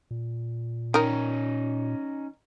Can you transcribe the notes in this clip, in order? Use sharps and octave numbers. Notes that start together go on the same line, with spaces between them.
A#2
D#3 C#4 D#4 A#4